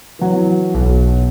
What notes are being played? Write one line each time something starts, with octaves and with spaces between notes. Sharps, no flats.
E3 F#3
B1